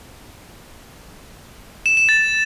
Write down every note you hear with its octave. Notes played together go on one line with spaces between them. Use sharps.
E7
E7
A6